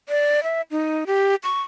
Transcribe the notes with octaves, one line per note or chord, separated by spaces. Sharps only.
D5
E5
D#4
G4
C#6